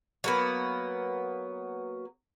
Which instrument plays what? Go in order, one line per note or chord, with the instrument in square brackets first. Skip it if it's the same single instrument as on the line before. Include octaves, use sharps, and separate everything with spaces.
[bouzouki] F#3 A#3 B3